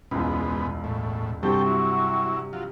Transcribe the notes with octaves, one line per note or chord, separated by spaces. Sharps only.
E1 C#2 G#2 B3
A2
G2 C3 C4 F#4 A4 G5
F#3 E4
F#3 F4